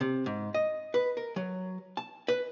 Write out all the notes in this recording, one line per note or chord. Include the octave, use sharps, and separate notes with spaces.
C3
G#2
D#5
B4
A#4
F#3
A5
B4